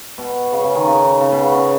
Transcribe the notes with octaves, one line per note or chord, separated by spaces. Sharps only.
B2
C#3
C#3
D#3
C#3
C#3
B2
C#3
C#3